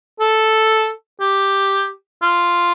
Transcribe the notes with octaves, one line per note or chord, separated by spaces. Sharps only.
A4
G4
F4